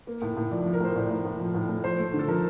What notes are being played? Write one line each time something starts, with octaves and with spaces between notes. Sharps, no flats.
A#3
A2
A2
F3 D5
F3
A#4
A2 C5
A2 D5
A2
A2
F3
A2
A2
F3 C5
A3
D3
A4
F3 A#4